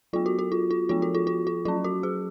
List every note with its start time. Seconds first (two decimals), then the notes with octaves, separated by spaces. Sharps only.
0.13 F#3 B3 F4
0.26 F#4
0.39 F#4
0.52 F4
0.71 F4
0.89 F3 B3 F4
1.02 F#4
1.15 F4
1.27 F4
1.47 F4
1.65 F#3 C#4 F4
1.84 F#4
2.03 G#4